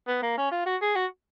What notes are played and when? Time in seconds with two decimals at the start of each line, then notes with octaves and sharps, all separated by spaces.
0.08 B3
0.23 A#3
0.38 C#4
0.52 F4
0.66 F#4
0.82 G#4
0.96 F#4